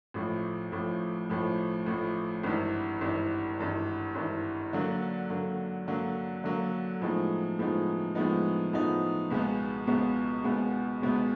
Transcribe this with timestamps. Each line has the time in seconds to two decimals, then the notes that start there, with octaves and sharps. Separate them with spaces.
0.14 A1 A2 F3
0.72 A1 A2 F3
1.29 A1 A2 F3
1.86 A1 A2 F3
2.43 G#1 G2 E3
3.01 G#1 G2 E3
3.58 G#1 G2 E3
4.15 G#1 G2 E3
4.73 D3 F#3 A#3
5.30 D3 F#3 A#3
5.87 D3 F#3 A#3
6.44 D3 F#3 A#3
7.01 A2 F3 G#3 B3 D#4
7.59 A2 F3 G#3 B3 D#4
8.15 A2 F3 G#3 B3 D#4
8.72 A2 F3 G#3 B3 D#4
9.30 C#2 B2 G#3 B3
9.87 C#2 B2 G#3 B3
10.44 C#2 B2 G#3 B3
11.02 C#2 B2 G#3 B3